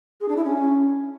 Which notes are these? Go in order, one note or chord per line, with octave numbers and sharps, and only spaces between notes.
G#4
D4
E4
C#4